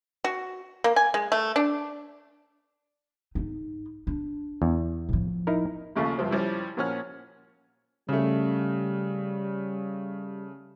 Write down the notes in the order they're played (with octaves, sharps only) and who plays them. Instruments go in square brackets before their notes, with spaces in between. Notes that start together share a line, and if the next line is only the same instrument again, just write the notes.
[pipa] F#4
A#3
G#5
G#3
A3
D4
[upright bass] G#2 D#4
D4
[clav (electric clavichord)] E2
[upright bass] A2 F3
[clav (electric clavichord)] D#4 E4 A#4
[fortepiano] A#1 D#2 C#3 A3 F4
G2 C3 F3 C4
F3 G3 C#4 E4
A#2 F3 C#4 F#5 F6
[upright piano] C#3 A3 [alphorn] G3